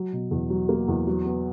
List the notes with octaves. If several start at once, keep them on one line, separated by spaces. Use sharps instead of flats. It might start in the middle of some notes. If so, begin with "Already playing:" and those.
Already playing: F#3
B2
E2
F#3
A#3
E2
F#3
B3